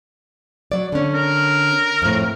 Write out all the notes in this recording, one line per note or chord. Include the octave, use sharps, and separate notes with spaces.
F#3 D5
D3 C#4
A#4
F2 A2